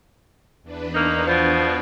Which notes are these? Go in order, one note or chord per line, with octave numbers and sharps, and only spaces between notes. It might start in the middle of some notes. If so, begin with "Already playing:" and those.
E2 D4 B4
D#3 A#3 D#4
B2 F3